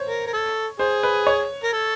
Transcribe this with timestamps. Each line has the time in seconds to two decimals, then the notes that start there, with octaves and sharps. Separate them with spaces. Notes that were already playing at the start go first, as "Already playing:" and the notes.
Already playing: C5 C#5
0.09 A#4
0.27 A#4
0.33 A4
0.79 G#4 C5
1.03 B4
1.27 C#5
1.64 A#4
1.73 A4